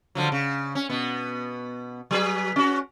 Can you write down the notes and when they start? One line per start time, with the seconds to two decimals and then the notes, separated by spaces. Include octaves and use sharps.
0.15 D3 F3 F#3
0.32 C#3
0.75 C#4
0.90 B2 B3
2.11 F#3 G#4 B4
2.56 C#4 F#4